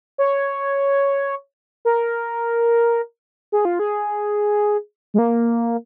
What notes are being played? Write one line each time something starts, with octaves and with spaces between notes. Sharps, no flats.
C#5
A#4
G#4
F4
G#4
G#3
A#3